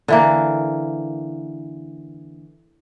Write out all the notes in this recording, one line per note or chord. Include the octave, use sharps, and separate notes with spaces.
D3 E3 A#3